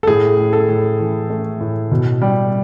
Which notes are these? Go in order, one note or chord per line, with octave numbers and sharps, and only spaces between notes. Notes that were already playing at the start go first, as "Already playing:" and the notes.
A4
A2 G#4
A2
A4
A2
E3
A3
A2
B2
G3